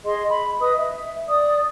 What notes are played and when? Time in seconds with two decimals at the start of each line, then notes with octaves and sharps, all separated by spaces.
0.05 G#4 D#5 C6
0.27 B5
0.60 B4 D#5 D#6
0.77 E5
1.28 D5 D#6